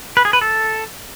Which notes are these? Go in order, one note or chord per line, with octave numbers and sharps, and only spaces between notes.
B4
G#4
B4
A4